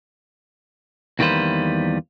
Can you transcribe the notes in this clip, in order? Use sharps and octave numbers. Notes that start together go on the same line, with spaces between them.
E2 D#3 G3 A#3 B4 C5